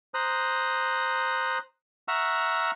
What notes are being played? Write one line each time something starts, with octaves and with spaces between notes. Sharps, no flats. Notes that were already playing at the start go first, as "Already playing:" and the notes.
C5 A#5 D#6 F#6
E5 F#5 A#5 C#6 E6 F6